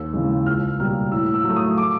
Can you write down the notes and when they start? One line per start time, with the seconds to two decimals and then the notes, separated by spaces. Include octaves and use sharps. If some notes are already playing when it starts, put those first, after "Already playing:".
Already playing: D#2 E6
0.13 C#3 E3 G#3
0.46 C#2 F6
0.79 B2 G3 A#3 F6
1.12 A2 E6
1.34 E6
1.44 F#3 A3
1.56 D#6
1.78 D6